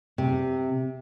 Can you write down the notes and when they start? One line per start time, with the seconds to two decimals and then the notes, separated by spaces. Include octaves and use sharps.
0.18 C3